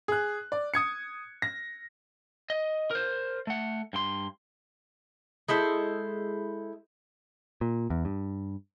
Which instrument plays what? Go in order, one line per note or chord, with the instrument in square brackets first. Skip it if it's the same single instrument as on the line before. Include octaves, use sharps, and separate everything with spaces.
[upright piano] G#4 F#6
D5
D#6 G#6 C#7
A#6
[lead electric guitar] D#5
A#4 C5
A3 F#5
G2 C6
[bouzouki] G#3 E4 A4 C5
[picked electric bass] A#2
E2
G2